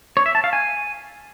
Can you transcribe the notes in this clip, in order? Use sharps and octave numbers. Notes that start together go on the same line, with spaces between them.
C#5
E5
A5
F5
G#5